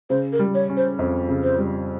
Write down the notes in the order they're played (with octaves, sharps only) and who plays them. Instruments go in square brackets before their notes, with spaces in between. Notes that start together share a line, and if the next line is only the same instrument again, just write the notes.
[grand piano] C#3 [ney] C5
[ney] A#4
[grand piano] G3
[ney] C#5
[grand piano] C#4
[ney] C5
[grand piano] F2
C#3
[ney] C5
[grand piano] G3